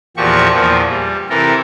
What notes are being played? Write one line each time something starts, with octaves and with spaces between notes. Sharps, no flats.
E2 A#2 F3 F#4 G4 C#6
E2 A#2 F3
G3
C3 E3 A4 A#4